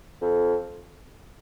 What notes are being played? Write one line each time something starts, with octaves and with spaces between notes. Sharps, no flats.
F2